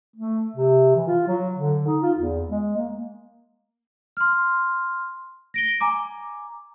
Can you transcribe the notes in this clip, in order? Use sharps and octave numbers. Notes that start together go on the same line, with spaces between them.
A3
C3
E3
F4
F#3
D3
D#4
F4
E2
G#3
A#3
C6 F6
A#6 D7 G7
G#5 A#5 D6